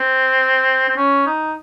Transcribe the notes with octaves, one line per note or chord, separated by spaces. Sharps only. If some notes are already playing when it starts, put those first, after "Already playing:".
Already playing: C4
C4
C#4
D#4